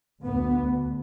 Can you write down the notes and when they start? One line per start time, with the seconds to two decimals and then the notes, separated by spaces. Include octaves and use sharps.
0.23 D2 B3